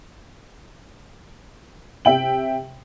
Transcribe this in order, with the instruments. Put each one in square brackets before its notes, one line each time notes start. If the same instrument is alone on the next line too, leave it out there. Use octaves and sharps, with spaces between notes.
[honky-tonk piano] C3 E5 G5 F#7